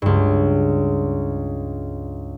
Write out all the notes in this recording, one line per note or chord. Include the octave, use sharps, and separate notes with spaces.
C#2 G2